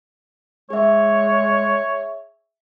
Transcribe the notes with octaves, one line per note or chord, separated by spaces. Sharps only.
G#3 G#4 C#5 E5